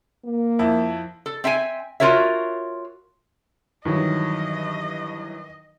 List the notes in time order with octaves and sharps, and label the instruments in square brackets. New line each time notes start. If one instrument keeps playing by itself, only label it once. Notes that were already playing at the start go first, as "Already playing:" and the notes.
[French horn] A#3
[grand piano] F2 E4 A5
[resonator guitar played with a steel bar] A4
C4 E5 G5 G#5
F4 F#4 A#4 C#5 E5
[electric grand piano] G2 E3 F#3 [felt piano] D#3 [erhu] D#5